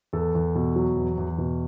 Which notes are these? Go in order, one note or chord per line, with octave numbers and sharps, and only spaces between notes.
E2 A4
E2
B2
F#3
E2
E2
B2